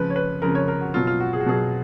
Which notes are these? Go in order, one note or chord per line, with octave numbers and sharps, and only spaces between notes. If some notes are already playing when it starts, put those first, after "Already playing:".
Already playing: C#3 F3 B4
C#5
B4
C#3 F3 A#4
C#5
A#4
F#4
B2 F#3 F4
F4
F#4
G#4
F#4
B2 F#3 G#4